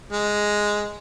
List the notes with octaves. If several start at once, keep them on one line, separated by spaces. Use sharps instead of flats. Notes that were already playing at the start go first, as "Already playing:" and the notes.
G#3